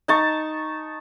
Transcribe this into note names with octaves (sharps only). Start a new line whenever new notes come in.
D#4 A5 C#6